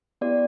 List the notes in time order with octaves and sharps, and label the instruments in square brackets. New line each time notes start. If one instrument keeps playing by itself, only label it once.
[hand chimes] B3 E4 G4 D5